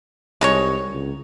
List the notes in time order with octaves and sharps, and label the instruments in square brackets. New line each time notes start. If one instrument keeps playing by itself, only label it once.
[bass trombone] C2 [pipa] G#3 D#4 C#5
[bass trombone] C#2